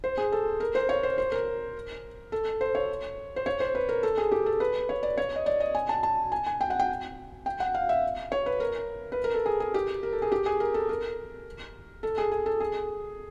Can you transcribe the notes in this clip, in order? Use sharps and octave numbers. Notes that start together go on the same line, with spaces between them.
C5
G#4
A4
A#4
C5
C#5
C5
C5
A#4
A4
C5
C#5
C5
C#5
C5
B4
A#4
A4
G#4
G4
A4
B4
C#5
D5
C#5
D#5
D5
D#5
G#5
A5
A5
G#5
G#5
G5
F#5
G5
G5
F#5
F5
E5
C#5
B4
A#4
B4
A#4
A4
G#4
G#4
G4
A#4
A4
G#4
G4
G#4
A#4
A4
A#4
A4
G#4
G#4
A4
G#4